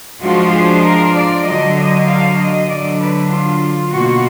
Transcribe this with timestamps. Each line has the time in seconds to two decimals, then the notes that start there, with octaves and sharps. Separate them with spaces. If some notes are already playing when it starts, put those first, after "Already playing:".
0.21 F3 G#3 D4 F4 F#4
0.53 G#4
0.83 A#4
1.14 D5
1.45 D3 F#3 D4 D#5
1.77 D#5
2.07 F5
2.37 D#5
2.68 D3 F#3 D4 D5
2.99 B4
3.30 F4
3.92 B2 A#3 F4 F#4